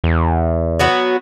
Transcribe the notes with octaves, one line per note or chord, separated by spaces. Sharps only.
E2
F#3 B3 F#4